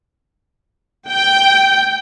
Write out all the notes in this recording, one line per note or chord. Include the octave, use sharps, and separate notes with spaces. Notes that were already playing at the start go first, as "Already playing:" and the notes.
G5